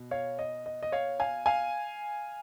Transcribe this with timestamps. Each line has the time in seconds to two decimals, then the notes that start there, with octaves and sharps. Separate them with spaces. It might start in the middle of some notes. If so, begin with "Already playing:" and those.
Already playing: B2
0.11 C#5 F5
0.39 D#5
0.66 D#5
0.83 D#5
0.92 C#5 F5
1.20 F5 G#5
1.46 F5 G#5